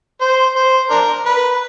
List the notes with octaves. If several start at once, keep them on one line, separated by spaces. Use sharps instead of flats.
C5
C5
D4 A#4
B4